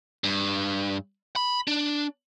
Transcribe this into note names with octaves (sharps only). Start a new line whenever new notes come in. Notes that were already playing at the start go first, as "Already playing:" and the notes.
G2
B5
D4